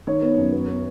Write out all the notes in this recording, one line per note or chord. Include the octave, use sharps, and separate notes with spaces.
D#3 C#5
B3
F#2
B3
B3